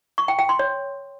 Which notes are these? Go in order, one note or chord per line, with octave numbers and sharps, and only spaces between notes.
C#6
G5
G5
C6
C#5